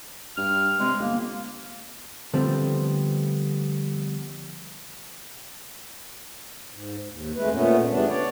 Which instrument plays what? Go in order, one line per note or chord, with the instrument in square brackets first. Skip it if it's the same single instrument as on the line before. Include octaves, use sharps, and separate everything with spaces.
[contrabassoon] G2 [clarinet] F6
[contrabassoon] C3 [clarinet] G#3
[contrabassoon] G1 [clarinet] A#3
[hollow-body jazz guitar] D3 F3 G3 A3 B3 C4
[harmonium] G#2
D#2
F2 G#3 A3 B4
A#2 A3 B3 C#4
E2 C#3 G3 A3 B3 D4
C#5 D5